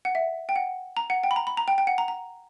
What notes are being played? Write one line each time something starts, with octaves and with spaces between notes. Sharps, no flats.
F#5
E5
G5
F#5
A#5
F#5
G5
B5
A#5
B5
A#5
G5
G5
F#5
A#5
A#5